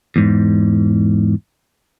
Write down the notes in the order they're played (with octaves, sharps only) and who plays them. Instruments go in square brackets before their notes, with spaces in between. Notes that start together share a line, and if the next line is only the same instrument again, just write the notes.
[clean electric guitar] E2 G#2